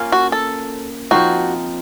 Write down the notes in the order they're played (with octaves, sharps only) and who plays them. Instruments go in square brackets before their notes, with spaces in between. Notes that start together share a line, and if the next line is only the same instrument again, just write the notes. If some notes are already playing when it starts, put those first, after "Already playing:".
Already playing: [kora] A#3 C#4 F4
[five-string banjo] F#4
A4
[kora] F3 C4 D#4 [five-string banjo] F#4